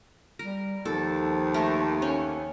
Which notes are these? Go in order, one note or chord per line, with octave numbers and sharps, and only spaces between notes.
G3 A#4
D#2 F3 A4
A3 A#4
C#4